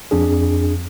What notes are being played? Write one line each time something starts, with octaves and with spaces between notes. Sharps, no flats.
F2 D4 G#4